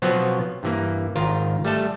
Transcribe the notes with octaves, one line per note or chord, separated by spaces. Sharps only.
B2 F3 F#3 B3 C4
G2 E3 A#3
G#1 D#3 F4 A#4
G3 A3 A4